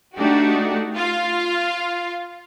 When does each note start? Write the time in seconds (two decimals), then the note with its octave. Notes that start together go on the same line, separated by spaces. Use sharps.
0.16 A3 D4 D#4 F#4 G4
0.97 F4 F5